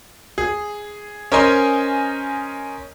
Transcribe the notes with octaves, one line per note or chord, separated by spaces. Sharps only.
G#4
C#4 A#4 C5 D#5 G#5 C6